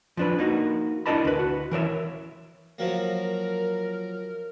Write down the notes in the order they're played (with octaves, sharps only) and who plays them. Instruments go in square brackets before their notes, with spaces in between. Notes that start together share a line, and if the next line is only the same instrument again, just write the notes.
[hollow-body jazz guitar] F3 D4 B4
A#3 D#4 F#4
D4 E4 A#4 D#5 A5 B5
D2 B4
F#4
E3 A#4 C#5 E5
[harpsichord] F3 F#3 A#3 [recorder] A#4